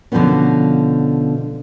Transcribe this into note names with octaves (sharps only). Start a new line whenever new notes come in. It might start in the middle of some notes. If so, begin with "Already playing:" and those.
B2 D3 F3 G3 B3 C#4